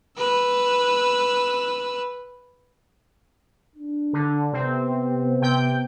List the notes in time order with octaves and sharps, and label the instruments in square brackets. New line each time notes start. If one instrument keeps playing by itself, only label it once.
[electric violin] B4 E6
[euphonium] D4
[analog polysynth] D3
[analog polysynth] C3 C4 [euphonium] B3
[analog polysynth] C3 G5 G6